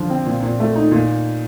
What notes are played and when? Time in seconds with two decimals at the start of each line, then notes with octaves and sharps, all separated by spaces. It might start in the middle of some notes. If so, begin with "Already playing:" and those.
Already playing: D3 F3 F4
0.10 C4
0.27 A#2
0.43 A#2
0.60 A3
0.76 D#4
0.92 A#2